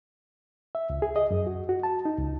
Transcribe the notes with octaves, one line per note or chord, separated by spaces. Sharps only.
E5
C#2
G#4
D#5
F#2
F#4
F#4
A5
D#4
C#2